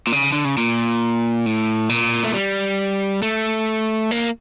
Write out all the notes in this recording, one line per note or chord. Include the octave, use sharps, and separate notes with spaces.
A#2
C#3
D3
C#3
A#2
A2
A#2
A3
G3
A3
A#3